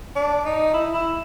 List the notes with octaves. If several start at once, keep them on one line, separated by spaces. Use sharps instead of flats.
D4
D#4
E4
E4